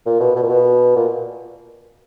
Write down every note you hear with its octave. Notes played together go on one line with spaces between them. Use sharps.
A#2
B2
B2
A#2
B2
A#2